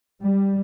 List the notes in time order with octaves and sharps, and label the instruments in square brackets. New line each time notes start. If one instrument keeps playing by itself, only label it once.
[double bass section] G3